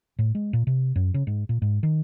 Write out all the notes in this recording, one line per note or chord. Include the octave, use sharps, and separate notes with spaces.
A2
G#3
A#2
C3
F#2
C#3
G#2
A#2
G#2
D#3